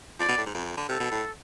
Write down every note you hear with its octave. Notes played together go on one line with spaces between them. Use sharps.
F3 D5
B2
A2
G#2
F2
D3
C3 A4
B2
A2